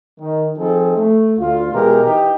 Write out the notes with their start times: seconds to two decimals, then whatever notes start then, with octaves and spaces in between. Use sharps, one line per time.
0.20 D#3
0.58 F3 C4 D#4 G#4 A4
0.97 A3
1.39 D2 F4
1.73 B2 E3 G#3 G4 A#4
2.04 E3 D#4 G4